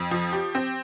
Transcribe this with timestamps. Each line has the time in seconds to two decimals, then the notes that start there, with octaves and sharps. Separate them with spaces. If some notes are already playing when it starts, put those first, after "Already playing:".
Already playing: F2
0.11 F3
0.33 G4
0.55 C4